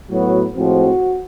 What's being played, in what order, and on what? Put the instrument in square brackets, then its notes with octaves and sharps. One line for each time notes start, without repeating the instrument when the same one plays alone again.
[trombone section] A2 F#3 B3 F#4
A2 F3 G#3 C4 F#4